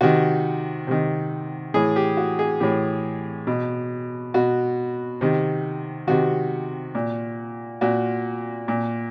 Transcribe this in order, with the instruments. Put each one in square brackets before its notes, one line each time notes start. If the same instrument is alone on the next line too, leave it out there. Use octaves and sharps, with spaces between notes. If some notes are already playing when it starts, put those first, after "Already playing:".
[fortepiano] C3 D#3 F#4
C3 D#3
A2 E3 G#4
G4
F#4
G#4
A2 E3 G4
B2
B2 F#4
C3 D#3
C3 D#3 F#4
A#2
A#2 F#4
A#2